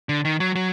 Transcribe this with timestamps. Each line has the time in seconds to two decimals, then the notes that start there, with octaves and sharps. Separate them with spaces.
0.09 D3
0.25 D#3
0.40 F#3
0.55 F#3